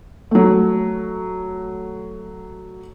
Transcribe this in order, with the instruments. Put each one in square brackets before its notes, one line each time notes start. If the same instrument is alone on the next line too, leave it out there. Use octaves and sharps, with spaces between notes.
[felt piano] F#3 A3